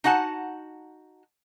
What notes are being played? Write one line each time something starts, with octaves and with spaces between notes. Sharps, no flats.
D#4 F#4 F#5 G#5 A5